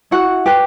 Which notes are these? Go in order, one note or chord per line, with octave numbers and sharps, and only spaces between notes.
E4 F#4 F#5
G4 B4 G5